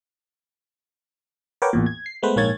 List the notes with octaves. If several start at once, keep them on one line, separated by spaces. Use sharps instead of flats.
A#4 B4 C#5 F#5 G5 D6
A1 E2 A#2
G#6
C7
G#3 A3 B3 B4 C5
A#1 G#2 A#3 C#5 G#6 A6